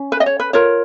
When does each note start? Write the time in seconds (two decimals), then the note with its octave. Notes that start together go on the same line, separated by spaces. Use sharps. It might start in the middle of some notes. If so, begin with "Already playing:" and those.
Already playing: C#4
0.12 B4
0.20 D#5
0.26 C#5
0.40 B4
0.53 F4 A#4 C#5